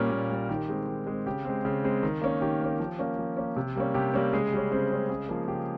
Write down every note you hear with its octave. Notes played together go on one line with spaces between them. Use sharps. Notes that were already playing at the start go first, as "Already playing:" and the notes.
Already playing: A#2 G3 A#3 C#4 A#4
A#2
G3 C#4
D#3 G4
G#3 C4
D#3
G#3 C4
C#3 G4
G#3 C4
C#3
G#3 C4
D#3
A#3 C#4
D#3 G4
A#3 C#4
F3
A#3 C#4
F3
A#3 C#4
C3
G3 A#3 C#4
C3 G4
G3 A#3 C#4
C#3 G#3 G#4
G3 C#4
C#3 C4 C5
G3 C#4
C#3 G#3 G#4
F3 A#3
C#3 G4